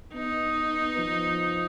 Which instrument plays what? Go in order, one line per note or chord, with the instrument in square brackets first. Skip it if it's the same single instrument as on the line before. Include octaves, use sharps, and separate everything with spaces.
[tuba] B3 [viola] D#4
[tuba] F3